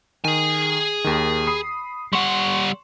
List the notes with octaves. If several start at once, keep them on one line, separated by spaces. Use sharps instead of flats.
D#3 G#4 G#5
D#2 D#3
B5 D#6 C7
G3 F#5 C6 C#6 E7